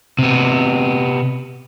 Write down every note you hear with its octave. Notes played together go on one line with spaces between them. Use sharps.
C3 B3